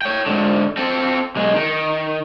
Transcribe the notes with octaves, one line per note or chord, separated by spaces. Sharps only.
C#5 G5
G#2 D3
C4 A4
B1 G#3
D#3